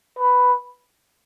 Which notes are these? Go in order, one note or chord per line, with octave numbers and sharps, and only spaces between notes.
B4